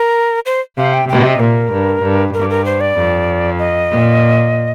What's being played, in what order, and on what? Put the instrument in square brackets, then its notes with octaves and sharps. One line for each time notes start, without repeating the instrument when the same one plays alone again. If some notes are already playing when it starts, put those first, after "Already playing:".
Already playing: [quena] A#4
C5
[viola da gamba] C3 [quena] F5
[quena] G5
[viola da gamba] C3 [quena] G5
[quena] D#5
[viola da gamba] A#2 [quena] A#4
[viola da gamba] G2
G2
[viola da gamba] G2 [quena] A#4
[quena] A#4
C5
D5
[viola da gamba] F2
[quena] D#5
[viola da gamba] A#2